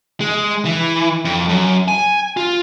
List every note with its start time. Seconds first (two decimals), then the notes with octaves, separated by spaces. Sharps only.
0.21 G#3
0.65 E3
1.25 F2
1.49 F#2
1.88 G#5
2.37 F4